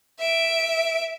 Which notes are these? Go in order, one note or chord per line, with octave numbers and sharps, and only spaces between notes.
E5 D7